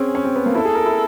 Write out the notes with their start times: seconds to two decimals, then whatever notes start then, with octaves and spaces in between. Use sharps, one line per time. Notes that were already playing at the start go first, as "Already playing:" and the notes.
Already playing: C4 C#4 G#4
0.15 C#4
0.25 C4
0.36 B3
0.46 A#3
0.55 E4 A4
0.65 G#4
0.75 A#4
0.86 E4